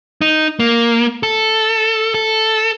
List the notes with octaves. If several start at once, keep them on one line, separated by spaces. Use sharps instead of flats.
D#4
A#3
A4
A4